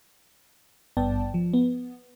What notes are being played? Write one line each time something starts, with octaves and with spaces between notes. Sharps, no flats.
G#1 G2 B3 D5 G5 A5
F3
B3